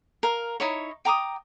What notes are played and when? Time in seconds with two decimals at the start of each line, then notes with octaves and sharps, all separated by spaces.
0.23 A#4 F5
0.60 D#4 E4 C#5
1.05 G5 A#5 D6 D#6